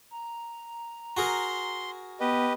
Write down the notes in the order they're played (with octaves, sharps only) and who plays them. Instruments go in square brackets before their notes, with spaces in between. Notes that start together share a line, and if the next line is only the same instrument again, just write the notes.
[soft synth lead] A#5
[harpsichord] F#4 G#4 A#4 [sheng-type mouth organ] C6
[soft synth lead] B3 [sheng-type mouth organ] G4 B4 D#5